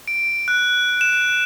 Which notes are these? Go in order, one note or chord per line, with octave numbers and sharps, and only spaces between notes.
D7
F#6
E7